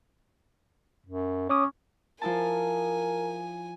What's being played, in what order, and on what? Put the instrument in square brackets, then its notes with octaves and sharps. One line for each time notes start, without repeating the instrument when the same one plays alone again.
[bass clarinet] F#2
[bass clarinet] C#4 [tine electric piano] C#5 D6 D#6
[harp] F3 E4 A5 [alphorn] A#4 [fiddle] G#5